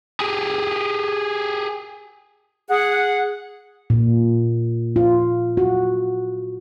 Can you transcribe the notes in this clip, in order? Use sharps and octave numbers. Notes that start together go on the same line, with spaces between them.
G4 G#4
G#4 F#5
A#2
F4
F#4